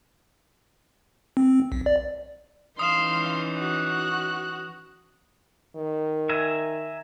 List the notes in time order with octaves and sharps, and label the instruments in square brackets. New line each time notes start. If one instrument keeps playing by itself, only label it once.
[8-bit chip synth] C4
B1
D5
[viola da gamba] E3 C#4 D#4 [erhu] F5 [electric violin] C6 [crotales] D#6 E7
[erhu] F#4 [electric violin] F#6
[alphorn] D#3
[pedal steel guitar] E5 G#5 A#5